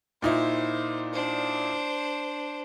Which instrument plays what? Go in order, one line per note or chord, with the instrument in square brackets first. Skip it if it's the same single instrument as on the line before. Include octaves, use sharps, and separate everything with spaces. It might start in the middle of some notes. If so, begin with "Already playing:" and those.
[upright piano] A#2 D#4 E4 [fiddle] C5
[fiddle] D4 C5